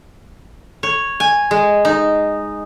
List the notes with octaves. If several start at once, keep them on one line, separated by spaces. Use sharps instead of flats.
C#5
G#5
G#3
D#4